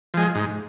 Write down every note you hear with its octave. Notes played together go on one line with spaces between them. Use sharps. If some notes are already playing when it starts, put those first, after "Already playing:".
F3 G#3
G#2